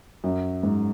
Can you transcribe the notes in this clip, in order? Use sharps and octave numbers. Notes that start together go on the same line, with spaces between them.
F#2
G#2